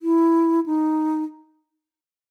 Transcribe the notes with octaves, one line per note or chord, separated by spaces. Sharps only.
E4
D#4